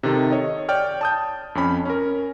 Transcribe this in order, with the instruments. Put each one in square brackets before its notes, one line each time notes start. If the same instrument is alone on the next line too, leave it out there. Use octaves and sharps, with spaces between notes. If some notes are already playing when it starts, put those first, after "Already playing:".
[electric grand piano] C3 D#3 A4
C#5 D#5
C#5 D5 G5 F6
A5 D#6 G6
F2 C#4 B5
C#4 A#4